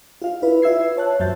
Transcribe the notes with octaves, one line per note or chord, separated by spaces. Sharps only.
F4 F5
E4 B4
F4 E5 E6 G#6 C7
C#5 A5 F#6
F#2 F#3 C5 E5 G6 A6